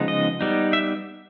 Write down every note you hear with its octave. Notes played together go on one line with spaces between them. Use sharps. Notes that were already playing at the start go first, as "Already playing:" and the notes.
Already playing: C#3 F3 G#3 B3 D#4
D#5
G3 B3 D#4
E5